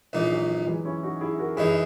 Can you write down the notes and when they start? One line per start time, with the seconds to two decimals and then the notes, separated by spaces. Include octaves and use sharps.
0.13 A#1 A#2 E3 G#3 A#3 D#4
0.31 F#3
0.49 F#3
0.67 E3 G#3
0.85 C#4 E4
1.03 D#4 F#4
1.21 E4 G#4
1.39 F#4 A#4
1.57 F#2 E3 G#3 D#4 E4 G#4